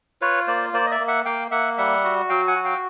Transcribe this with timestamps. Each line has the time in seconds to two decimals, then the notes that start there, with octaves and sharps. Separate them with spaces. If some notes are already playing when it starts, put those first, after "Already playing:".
0.21 F4 B4 C#5
0.47 A#3 C5 D5
0.73 A#3 C5 D5
0.86 D#5
0.91 D5 E5
1.00 A#3
1.08 E5 F#5
1.25 A#3 F5 G5
1.51 A#3 E5 F#5
1.78 G3 E5 F#5
2.04 F#4
2.29 F#3 F5 G5
2.47 F#5 G#5
2.56 F#4
2.64 F5 G5